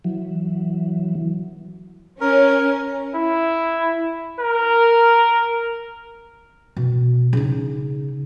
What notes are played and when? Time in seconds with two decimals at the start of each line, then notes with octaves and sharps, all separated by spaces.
0.04 E3 F#3
2.21 C#4 A#4
3.15 E4
4.40 A#4
6.77 B2
7.33 C#3 D#4